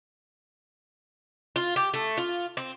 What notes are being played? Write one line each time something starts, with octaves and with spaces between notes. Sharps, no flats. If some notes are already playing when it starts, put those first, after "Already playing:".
F4
G4
A3
F4
C4